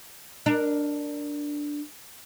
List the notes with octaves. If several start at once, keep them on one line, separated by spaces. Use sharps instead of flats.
D4 A#4